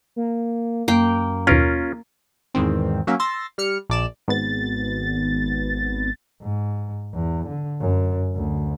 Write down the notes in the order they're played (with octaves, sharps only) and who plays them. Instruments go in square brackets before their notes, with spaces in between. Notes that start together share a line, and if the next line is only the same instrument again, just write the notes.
[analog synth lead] A#3
[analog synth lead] F#2 [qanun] A#3 G5
[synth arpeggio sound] D#2 B2 F5 [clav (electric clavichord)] C#4 F4 A#4
[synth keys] E2 G#2 D#3 C4
F#3 A#3 C#4 E5
C6 E6 A6 A#6
G3 F6 C#7
A#1 D5 E7
[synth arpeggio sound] G#1 B3 A6
[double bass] G#2
E2
D3
F#2
D2